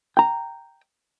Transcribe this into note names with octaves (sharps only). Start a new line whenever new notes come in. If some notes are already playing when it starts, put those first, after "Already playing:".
G5 A#5